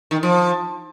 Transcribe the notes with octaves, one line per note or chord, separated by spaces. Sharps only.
D#3
F3